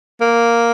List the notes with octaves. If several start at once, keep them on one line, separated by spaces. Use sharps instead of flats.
A#3